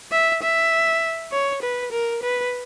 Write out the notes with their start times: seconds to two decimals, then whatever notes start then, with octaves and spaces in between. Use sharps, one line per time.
0.12 E5
0.42 E5
1.32 C#5
1.62 B4
1.92 A#4
2.22 B4